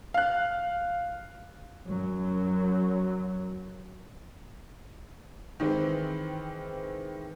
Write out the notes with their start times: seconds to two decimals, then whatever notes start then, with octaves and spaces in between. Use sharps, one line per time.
0.14 F5 F#6
1.86 F#2 F#3
5.60 D#3 E3 G#3 C4 B4